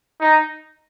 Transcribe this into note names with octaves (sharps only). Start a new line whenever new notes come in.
D#4